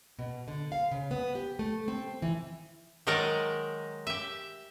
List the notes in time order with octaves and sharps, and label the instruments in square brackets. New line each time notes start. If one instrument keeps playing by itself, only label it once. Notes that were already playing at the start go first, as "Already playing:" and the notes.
[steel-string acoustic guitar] B2
D3
F5
C#3
B3
G4
A3
C4
E3
[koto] D#3 F#3 G#3 D#4 A#4 D5
G4 E5